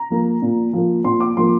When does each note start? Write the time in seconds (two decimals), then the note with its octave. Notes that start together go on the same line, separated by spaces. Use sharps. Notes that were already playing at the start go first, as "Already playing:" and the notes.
Already playing: A#5
0.10 F3 A#3
0.42 A#2
0.73 F3 A#3
1.04 A#2 C6
1.20 D6
1.37 F3 A#3 C6